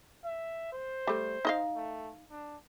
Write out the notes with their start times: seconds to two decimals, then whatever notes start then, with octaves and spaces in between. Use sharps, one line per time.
0.24 E5
0.73 C5
1.07 G3 A3
1.45 D#4 D#5 F5
1.75 A3
2.31 D4